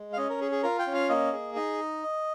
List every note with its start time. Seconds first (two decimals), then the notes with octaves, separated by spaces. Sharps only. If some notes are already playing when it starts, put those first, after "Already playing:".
Already playing: G#3
0.13 F5
0.17 C#4 D#5
0.30 A#4
0.41 G#4
0.52 G#4
0.63 F4 A#4
0.79 G5
0.87 C#4
0.94 F5
1.09 A#3 D#5
1.33 G#4
1.56 D#4 D#5